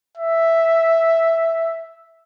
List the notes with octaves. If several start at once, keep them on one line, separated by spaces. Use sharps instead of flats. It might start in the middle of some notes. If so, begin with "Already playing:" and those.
E5